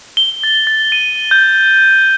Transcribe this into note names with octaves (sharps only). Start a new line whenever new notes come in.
G7
A6
A6
D#7
G6